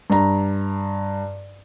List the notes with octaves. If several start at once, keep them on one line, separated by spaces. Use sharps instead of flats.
G2 A#5